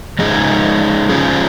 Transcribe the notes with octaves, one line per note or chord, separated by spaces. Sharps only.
F3 G#3 D#4 G#4
F3 C#4 F4 G#4